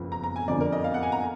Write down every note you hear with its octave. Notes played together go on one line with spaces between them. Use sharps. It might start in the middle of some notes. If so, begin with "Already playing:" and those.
Already playing: F#1 F2 F3 B3
A#5
A#5
G#5
F2 D3 F3 D5
A#4
D#5
F5
F#5
G#5
A#5